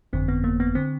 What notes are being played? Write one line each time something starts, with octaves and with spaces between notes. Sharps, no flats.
G1 F2 D3 C4
B3
A#3
B3
D3 C4